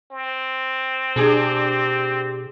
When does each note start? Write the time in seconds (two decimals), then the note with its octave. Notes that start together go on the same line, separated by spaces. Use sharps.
0.11 C4
1.16 B2 D4 G4 G#4